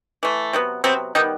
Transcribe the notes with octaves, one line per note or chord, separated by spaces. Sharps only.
E3 A3
C3 F#3 B3
C3 F#3 B3 C4
D#3 G3 B3 D#4